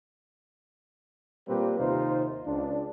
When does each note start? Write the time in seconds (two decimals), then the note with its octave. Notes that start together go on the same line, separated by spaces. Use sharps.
1.48 A#2 G3 A#3 C4 G4 B4
1.78 D#2 C3 D#4 F4 C5
2.46 C#2 D4